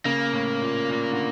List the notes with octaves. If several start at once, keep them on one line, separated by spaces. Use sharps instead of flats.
C#3 A#3
A2
A#2
A#2
D3